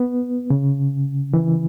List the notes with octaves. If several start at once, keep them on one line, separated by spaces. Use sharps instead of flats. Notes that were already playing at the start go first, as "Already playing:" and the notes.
Already playing: B3
C#3
E3